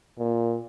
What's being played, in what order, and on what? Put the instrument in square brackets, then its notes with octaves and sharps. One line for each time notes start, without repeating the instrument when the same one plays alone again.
[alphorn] A#2